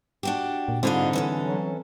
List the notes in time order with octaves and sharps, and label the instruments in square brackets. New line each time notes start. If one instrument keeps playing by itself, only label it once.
[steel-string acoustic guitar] D4 F#4 G4
[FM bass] A#2
[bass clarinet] G#2 [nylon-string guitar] D3 G3 [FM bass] C4 [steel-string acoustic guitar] F4 G#4 D#5
[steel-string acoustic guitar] E3 C#4 A4
[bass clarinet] F#3